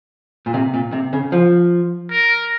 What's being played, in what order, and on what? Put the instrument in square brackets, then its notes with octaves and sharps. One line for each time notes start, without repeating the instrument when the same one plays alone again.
[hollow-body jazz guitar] A#2
C3
A#2
C3
C#3
F3
[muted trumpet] A#4